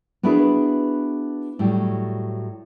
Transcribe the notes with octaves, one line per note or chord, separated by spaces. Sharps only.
B3 D4 E4 F#4 G#4 B4
A2 F#3 G3